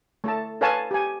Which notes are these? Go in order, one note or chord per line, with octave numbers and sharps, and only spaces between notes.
A3 A4 A5
A4 B4 C#5 F5 G#5 A5
G4 G#5